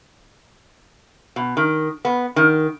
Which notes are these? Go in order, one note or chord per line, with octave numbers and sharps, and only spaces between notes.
B2
D#3
B3
D#3